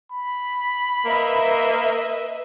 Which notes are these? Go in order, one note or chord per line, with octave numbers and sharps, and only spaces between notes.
B5
A#3 B4 D#5 E5